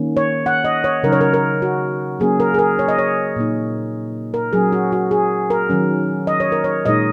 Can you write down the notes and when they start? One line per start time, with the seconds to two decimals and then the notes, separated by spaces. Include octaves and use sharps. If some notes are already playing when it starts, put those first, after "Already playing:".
Already playing: D#3 A#3 C#4
0.17 C#5
0.46 F#5
0.65 D#5
0.84 C#5
1.03 C#3 F#3 D#4 A#4
1.12 C#5
1.21 A#4
1.34 A#4
1.62 F#4
2.20 F#3 A#3 C#4 G#4
2.40 A#4
2.54 G#4
2.59 A#4
2.79 C#5
2.88 D#5
2.98 C#5
3.36 A#2 A#3 D#4
4.34 A#4
4.53 F#3 C#4 G#4
4.72 F#4
4.92 F#4
5.11 G#4
5.50 A#4
5.70 D#3 F#3 C#4
6.27 D#5
6.40 C#5
6.52 A#4
6.64 C#5
6.85 A#2 G#3 D#4 D#5